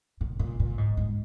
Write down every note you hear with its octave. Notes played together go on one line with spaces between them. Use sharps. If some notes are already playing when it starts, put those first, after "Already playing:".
A#2
A#2
A#2
G#2
G#2